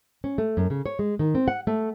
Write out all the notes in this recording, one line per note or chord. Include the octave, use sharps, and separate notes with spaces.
C#4
A3
F#2
C#3
C#5
G#3
D#3
C4
F#5
A3